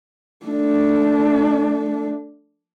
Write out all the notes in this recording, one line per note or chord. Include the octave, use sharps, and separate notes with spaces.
A3 D4